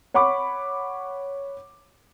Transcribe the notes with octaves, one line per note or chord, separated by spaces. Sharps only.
C#5 F#5 B5 C#6 D6